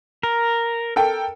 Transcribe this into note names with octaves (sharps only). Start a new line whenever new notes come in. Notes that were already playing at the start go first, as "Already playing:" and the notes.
A#4
A4 A#4 G5